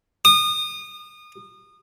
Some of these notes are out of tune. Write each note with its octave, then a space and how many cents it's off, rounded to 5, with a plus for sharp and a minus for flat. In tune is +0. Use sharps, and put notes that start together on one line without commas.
D#6 -30